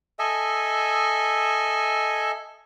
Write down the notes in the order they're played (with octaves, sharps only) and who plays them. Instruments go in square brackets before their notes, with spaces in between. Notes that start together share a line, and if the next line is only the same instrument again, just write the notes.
[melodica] A4 D#5 E5 G#5